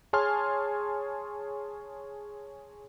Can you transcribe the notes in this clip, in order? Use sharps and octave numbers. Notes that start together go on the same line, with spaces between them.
G#4 C#5 G#5 A5 C6 F6